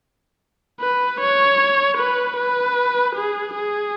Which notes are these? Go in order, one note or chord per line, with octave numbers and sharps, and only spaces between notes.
B4
C#5
B4
B4
G#4
G#4